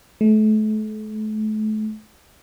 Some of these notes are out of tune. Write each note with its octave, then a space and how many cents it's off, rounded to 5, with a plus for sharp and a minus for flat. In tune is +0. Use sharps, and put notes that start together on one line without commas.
A3 -35